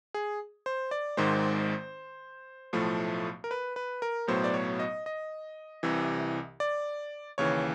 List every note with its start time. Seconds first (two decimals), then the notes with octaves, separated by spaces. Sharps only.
0.14 G#4
0.66 C5
0.91 D5
1.17 G#1 G#2 D#3 G#3 C5
2.73 B1 A2 F3 A3
3.44 A#4
3.51 B4
3.76 B4
4.02 A#4
4.27 B1 A2 F#3 B3 C5
4.44 D5
4.54 C#5
4.80 D#5
5.06 D#5
5.83 C2 C3 E3
6.60 D5
7.38 D#2 C#3 E3 C#5